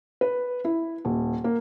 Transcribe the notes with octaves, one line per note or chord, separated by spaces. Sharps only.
B4
E4
D#1
A#3